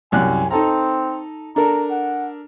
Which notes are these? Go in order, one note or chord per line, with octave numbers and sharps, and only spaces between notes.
C2 F#2 G#5 F#6
C4 D#4 A4 A#5
D4 A4 A#4 A#5
F#5